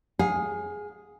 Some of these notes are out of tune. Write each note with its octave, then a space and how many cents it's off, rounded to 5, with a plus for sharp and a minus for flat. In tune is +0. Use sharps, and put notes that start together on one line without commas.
G#4 +0 F5 +30